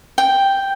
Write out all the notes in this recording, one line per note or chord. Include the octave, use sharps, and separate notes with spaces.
G5